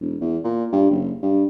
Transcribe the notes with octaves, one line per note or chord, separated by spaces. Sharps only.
E1
E2
A#2
G2
F#1
G2